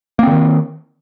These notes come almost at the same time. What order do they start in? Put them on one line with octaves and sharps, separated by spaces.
A#3 C4 D3 D#3